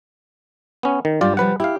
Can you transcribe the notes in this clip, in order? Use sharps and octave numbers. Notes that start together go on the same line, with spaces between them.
B3 C#4
D#3
G2 G3 F4 D5
C3 F3 G3 B4 F#5
E4 G4 F5